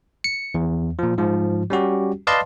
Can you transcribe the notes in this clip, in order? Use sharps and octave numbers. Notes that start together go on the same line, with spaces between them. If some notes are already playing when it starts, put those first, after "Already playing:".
C#7
E2
A#2 F3
G#2 F3
G3 C#4 F#4 G4
B4 D5 D#5 F5 A5 C6